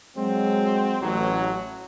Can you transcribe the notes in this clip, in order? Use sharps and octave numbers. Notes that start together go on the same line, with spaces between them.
F#3 G#3 C4
A1 F#3